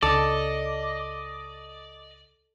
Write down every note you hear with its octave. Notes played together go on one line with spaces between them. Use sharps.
C#2 A4 D5 D#5